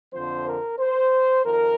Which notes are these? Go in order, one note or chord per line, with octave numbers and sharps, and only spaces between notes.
F2 D3 F3 C4 C5
A#4
C5
F2 D#3 A#4